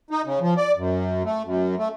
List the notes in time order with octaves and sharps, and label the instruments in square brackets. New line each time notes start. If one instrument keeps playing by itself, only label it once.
[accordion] D#4
C#3
F3
D5
F#2
A3
F#2
A3